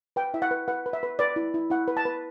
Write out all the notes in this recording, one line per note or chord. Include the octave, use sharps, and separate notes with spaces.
B4 G5
E4 E5
F#5
B4
B4 F#5
B4
E5
B4
B4 D5
E4
E4
E4 F#5
B4
A5
B4